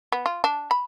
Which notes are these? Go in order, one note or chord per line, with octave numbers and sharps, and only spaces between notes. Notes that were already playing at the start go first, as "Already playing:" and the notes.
B3
F4
D4
B5